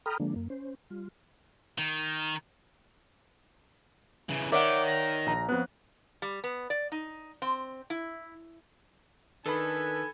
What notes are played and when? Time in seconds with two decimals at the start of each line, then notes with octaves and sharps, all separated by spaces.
0.06 A4 G5 A#5 B5 D#6 F6
0.20 D3 F3 G#3 A#3 D4
0.36 F#2 A#3
0.50 C#4 C5
0.90 G3 F4
1.78 D#3
4.29 C#3 E3
4.52 D#3 A#4 C#5 D5 E5 F#5 D6
4.86 A#6
5.26 A#1 A#5
5.49 F2 B3 F#6
6.22 G3
6.44 B3
6.70 D5
6.92 D#4
7.42 C4
7.90 E4
9.46 D#3 D4 A4 B4 G#5 B5